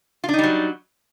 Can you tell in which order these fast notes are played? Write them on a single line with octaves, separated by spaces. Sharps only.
F4 D4 D#4 G3 F#3